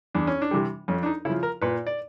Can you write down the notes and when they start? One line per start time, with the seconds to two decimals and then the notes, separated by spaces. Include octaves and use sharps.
0.15 E2 D4
0.27 C#4
0.42 D4
0.51 C3 E3 G3
0.88 F2 C#4
1.03 D4
1.06 D#4
1.25 C#3 E4
1.29 F3
1.43 A#4
1.62 A#2 B4
1.87 D5